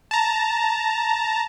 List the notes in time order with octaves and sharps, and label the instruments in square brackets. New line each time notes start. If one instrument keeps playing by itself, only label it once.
[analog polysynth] A5 A#5